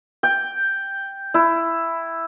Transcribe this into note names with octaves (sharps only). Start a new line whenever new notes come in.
G5
E4